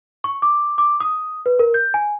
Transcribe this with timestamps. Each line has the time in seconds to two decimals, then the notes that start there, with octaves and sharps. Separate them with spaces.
0.24 C#6
0.42 D6
0.78 D6
1.00 D#6
1.46 B4
1.59 A#4
1.74 G6
1.94 G#5